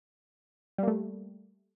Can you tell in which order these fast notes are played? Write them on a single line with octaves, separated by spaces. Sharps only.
G3 A#3 A3